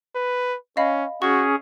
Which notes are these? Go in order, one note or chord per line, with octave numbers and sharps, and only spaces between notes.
B4
C#4 D#5 F5 B5
C#4 F#4 G#4 C#6